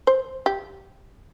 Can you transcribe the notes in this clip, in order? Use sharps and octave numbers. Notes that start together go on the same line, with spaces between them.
C5
G4